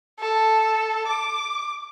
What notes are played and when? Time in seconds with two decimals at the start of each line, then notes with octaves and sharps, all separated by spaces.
0.20 A4
1.08 D6